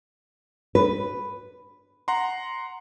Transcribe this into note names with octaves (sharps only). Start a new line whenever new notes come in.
B4
F#5 A#5 C6